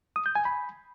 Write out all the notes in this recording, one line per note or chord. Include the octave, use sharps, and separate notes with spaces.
D#6
G6
G#5
B5